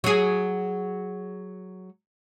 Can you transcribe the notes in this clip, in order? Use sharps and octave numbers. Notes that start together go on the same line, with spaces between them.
F#3 G#4